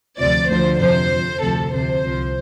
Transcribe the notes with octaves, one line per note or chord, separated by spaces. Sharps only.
D2 C3 F3 D5
D2 D3 F3 C5
F2 C3 F3 C5
F2 F3
D2 C3 F3 A4
D2 C3 F3 C5
C2 C3 F3